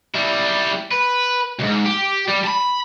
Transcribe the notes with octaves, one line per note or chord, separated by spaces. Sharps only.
G3 E4
B4
C#2 G#2
G4
G3
A5 B5